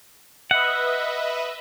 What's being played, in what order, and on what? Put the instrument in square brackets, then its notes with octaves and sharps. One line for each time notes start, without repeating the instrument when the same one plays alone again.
[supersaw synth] B4 D#5 E5 [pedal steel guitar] F#5